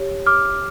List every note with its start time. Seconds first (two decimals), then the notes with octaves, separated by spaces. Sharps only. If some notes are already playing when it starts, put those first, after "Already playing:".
Already playing: G4 C#5
0.26 D6 F6